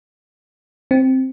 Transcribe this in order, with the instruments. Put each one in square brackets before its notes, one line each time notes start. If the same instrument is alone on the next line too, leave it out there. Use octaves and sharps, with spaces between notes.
[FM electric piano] C4